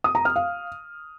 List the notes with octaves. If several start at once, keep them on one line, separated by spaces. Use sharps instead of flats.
D#6
A#5
F6
F5